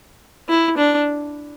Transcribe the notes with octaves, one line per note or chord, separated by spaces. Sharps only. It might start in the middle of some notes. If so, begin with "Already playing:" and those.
E4
D4